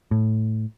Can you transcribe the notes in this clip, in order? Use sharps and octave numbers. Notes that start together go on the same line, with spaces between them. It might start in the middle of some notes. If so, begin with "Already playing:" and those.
A2